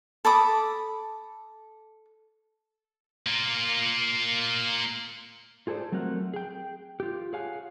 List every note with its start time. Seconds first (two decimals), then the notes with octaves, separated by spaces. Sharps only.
0.25 A4 B5 D6 D#6
3.27 A#3 F4
5.67 F4 G#4 A4 C5 D5
5.92 F#3 A3 C4 A#4 F#5
6.34 G#4 G5
7.00 F4 G4
7.33 G#4 C#5 F5 F#5 G#5